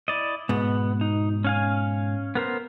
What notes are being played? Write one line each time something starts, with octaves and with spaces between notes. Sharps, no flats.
E4 D5 D#5
G#2 B2 B3
D#4
C#4 F5 G#5
B3 A#4 C5